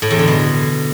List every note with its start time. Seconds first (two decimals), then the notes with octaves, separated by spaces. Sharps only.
0.02 A2
0.11 E2
0.19 D3
0.28 B2